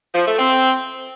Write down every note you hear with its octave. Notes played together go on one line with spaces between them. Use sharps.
F3
A3
C4